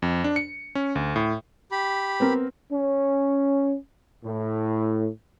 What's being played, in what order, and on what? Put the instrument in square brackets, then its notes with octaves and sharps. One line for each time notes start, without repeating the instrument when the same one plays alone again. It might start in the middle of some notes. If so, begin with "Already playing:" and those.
[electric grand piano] F2
D4
C#7
C#4
D2
A2
[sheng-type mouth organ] G4 B5
[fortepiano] B3 C4 A#4
[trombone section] C#4
A2